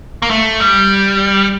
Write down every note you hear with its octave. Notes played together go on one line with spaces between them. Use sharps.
A#3
A3
G3